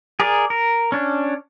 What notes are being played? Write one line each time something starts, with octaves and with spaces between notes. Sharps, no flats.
G#4 A#4 D5
A#4
C#4 D4